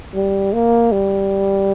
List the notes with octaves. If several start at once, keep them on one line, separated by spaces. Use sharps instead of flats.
G3
A#3
G3